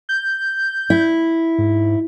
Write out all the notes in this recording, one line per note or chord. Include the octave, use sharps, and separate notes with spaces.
G6
E4
G#2